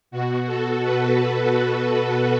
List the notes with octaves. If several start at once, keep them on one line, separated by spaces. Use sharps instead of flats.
B2 F#4
A4
B4